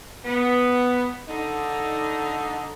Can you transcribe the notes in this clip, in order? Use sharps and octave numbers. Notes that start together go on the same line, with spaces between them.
B3
D3 D#4